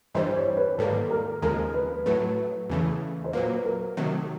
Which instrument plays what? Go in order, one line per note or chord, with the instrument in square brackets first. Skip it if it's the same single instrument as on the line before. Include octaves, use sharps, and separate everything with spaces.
[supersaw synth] G2 E3 G3 [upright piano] C5
[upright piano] C#5
B4
[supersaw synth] G#2 D#3 G3 A#3 [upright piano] A4
[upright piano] A#4
[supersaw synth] D#2 C#3 F3 G#3 [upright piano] A#4
[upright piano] B4
[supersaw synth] A2 F#3 A3 [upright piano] B4
[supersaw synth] E2 C#3 E3 A3
[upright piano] C5
[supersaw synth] A#2 F#3 A#3 [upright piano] B4
[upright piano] A#4
[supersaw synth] C3 D#3 F#3 A3